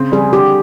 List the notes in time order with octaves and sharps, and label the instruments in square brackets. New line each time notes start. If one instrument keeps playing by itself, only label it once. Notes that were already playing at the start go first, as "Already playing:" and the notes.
Already playing: [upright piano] C#3 C4
[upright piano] G3 [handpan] G#4
[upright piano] D3 [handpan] G4